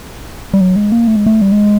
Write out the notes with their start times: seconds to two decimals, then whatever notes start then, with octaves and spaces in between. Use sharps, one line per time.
0.54 G3
0.61 F#3
0.76 G#3
0.92 A#3
1.07 A3
1.16 G#3
1.26 A3
1.41 G3
1.52 G#3